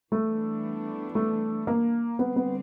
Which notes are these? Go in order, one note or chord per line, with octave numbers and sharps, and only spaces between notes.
E3 G3 A3 B3 D4
A3
A#3
D3 G3 B3 C4
B3